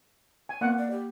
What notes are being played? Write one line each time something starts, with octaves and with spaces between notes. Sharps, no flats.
G#5
A#3 B3 F#5
D5
G4